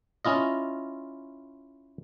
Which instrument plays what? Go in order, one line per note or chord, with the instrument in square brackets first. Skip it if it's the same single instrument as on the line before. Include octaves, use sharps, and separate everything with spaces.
[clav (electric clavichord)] C#4 E4 F4 D#5